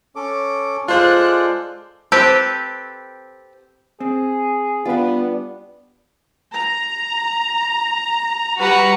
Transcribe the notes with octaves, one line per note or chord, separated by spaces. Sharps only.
C#4 A4 D6
G#3 F4 A4 C5 D5 F#6
C4 G4 A4 B4
C4 G#4
G3 B3 D4 F4 B4
A#5
G3 F#4 B4 F#5 A#5